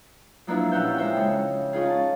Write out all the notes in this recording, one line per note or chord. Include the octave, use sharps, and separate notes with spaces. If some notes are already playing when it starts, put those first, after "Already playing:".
F3 F#3 A#3 B3 D4 E4
A#2 C#4 G4 F#5 E6 G6
G#3 D#4 C5 E5 G5
C#3 D#4 A4
C#4 D#4 F4 G#4
A5